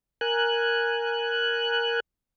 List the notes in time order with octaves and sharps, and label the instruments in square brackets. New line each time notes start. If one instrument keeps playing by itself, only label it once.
[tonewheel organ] A#4 G#5 F#6